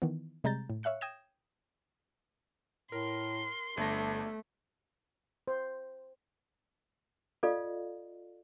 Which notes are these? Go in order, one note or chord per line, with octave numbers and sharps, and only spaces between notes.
D#3 E3 B3
C3 G3 G#3 A#5 G6 A6
A2
C#5 E5 F5 F#6 C#7
G5 D#6 G6 G#6 A#6 E7
A2 A#4 C6
G1 A3 D4 A#6
C5
F4 A4 D5 D#5 F5